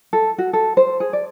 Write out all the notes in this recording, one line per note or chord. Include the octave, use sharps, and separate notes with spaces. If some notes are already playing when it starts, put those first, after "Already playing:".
A4
F#4
A4
C5
G#4
D5